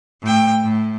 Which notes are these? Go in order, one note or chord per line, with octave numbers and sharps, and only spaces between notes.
A2 G5
A2